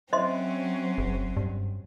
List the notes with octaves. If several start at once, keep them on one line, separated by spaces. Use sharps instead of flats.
F#3 C4 C#4 C5 D#5 E5 C6
F#1
G2